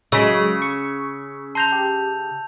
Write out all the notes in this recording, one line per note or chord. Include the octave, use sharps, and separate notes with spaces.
C#3 F#3 G#3 E6 B6
C#6
A5 A#5 C6 G6 F7
G4